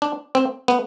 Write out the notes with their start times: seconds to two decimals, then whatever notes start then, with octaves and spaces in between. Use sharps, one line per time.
0.02 D4
0.35 C4
0.68 B3